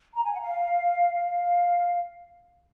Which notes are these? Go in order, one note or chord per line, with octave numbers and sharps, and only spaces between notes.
A#5
G#5
F#5
F5
F5